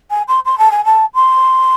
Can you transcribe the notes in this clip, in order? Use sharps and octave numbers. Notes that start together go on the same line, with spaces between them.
G#5
C6
C6
A5
G#5
A5
C6